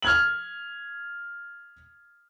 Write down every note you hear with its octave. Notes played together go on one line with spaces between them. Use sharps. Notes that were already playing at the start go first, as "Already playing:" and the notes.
F6 G#6 F#7